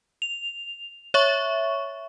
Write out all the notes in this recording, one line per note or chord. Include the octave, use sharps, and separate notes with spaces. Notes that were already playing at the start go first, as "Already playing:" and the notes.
F7
C#5 E5 C#6